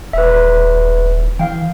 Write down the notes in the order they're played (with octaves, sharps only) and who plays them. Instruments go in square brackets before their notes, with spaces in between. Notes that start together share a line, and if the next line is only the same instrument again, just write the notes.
[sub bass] D#1 [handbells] B4 E5
[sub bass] E3 [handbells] F5 G5